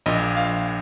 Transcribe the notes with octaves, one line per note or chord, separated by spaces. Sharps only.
A#1 A#2 D#5
F5